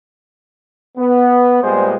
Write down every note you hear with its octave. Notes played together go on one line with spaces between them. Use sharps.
B3
A#2 G3 G#3 B3 G#4 C5